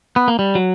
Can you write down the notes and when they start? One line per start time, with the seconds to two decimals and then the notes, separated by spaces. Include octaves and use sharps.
0.16 B3
0.28 A#3
0.39 G3
0.55 F#3